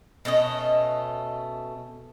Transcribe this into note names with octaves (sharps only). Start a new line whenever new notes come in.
B2 A3 C#4 D#5